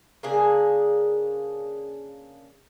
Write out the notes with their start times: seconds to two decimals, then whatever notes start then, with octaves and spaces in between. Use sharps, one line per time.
0.23 C#3 A#3 D4 G#4